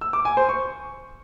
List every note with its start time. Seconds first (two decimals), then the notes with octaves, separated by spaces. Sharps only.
0.01 E6
0.13 D6
0.25 G#5
0.37 C5
0.49 C#6